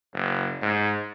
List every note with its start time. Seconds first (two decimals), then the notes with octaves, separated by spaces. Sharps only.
0.14 F#1
0.62 G#2